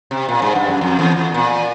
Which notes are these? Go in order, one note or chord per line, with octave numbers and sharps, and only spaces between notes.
C3
A#2
G#2
G2
F#2
F2
E2
E2
A#2